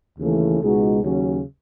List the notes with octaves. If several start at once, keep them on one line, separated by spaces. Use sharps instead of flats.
D#2 C#3 E3 A3
C#2 B2 G#3 D#4 F#4
D#2 C#3 F#3 C#4